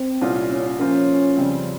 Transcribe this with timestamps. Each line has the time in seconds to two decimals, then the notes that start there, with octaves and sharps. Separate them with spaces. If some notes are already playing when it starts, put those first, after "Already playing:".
Already playing: C4
0.21 C2 A#2 G3 C#4 F4
0.50 C#4
0.78 F3 A#3 C#4 F4 C5
1.37 F2 C#3 G3 C4